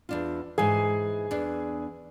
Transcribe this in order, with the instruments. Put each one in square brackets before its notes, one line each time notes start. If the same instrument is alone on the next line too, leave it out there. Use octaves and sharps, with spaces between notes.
[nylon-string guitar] E2 D4 F4
[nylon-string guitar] G#2 E3 [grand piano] G#4 G#5
[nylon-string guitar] E2 D4